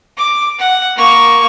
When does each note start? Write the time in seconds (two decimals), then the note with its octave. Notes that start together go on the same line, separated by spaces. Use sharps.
0.17 D6
0.59 F#5
0.97 A#3 C#6